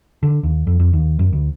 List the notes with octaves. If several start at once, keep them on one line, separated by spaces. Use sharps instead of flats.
D3
D#2
F2
F2
D#2
F#2
D2